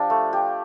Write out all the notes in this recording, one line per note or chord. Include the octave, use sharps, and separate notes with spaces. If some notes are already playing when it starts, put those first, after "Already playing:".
Already playing: F3 D4 G4 F5
A3
G4